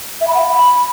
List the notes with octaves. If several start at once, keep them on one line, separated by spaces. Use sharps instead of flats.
E5
B5
F#5
F5
B5